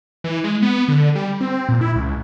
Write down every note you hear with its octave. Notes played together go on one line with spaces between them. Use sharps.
E3
G#3
B3
D3
G3
C4
A#2
E4
C#2